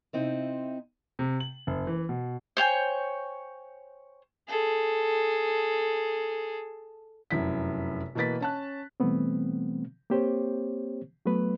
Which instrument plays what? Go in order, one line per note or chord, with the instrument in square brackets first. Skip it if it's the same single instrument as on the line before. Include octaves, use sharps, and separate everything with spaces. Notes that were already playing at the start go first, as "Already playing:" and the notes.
[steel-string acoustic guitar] C3 C4 D#4 E4
[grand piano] C3
F#7
F#1
E3
B2
[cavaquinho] C5 C#5 G5 G#5
[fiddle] G#4 A4
[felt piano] F1 F#2 E4 B6
B2 E3 A#3 B4 A6 B6
C#4 A5 F#6
[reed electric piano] B2 E3 G3 A3 B3 C4
A#3 C4 G4 C5 C#5
F#3 A3 B3 B4